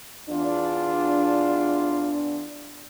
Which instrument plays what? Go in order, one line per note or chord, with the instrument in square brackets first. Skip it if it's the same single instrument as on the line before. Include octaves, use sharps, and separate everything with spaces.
[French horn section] E2 D4 [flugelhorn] F4